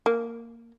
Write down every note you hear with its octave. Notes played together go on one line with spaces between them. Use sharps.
A#3